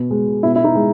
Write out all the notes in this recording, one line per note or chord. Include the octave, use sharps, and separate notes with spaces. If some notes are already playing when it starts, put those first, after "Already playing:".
Already playing: B2
G#3
B2 E4
E4
D#4
G#3